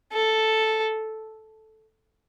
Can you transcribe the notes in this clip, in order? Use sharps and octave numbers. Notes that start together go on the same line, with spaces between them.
A4